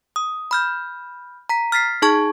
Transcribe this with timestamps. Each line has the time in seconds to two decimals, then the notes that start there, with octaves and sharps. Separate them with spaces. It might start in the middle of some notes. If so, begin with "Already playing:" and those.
0.16 D#6
0.51 B5 F6 G6
1.49 A#5 B6
1.72 F6 A6 B6 C7
2.02 D#4 G#4 A5 C#6 G#6